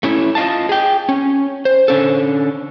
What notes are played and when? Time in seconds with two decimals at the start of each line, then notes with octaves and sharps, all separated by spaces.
0.03 A3 C#4 E4
0.35 F4 D#5 F5 A5
0.69 G#4 G5
1.09 C#4
1.65 C5
1.88 D3 C#4 A4